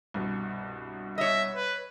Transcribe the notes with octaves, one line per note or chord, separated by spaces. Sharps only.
C2 G2 B2
C#5 D#5 E5
B4